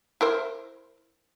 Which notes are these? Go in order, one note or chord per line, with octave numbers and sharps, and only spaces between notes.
E4 A#4 C5